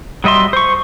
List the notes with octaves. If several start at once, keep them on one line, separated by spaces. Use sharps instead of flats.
F#3 G3 D#5 E5 C6
C5 C#6